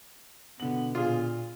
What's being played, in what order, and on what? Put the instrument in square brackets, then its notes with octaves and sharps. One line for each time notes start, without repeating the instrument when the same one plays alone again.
[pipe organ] B2 [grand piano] D3 F#7 [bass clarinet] B3
[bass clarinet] A#2 [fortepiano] F4 G#4